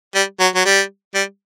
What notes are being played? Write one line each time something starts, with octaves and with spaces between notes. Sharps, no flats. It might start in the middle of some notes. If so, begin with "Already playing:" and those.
G3
F#3
F#3
G3
G3